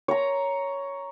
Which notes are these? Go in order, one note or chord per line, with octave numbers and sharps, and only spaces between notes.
C#5 A#5